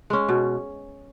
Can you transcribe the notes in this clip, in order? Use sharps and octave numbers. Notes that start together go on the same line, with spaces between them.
G#3 C#4
B2